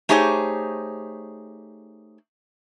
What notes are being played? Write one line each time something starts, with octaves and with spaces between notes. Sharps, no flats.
A3 D#4 G4 G#4 C5 C#5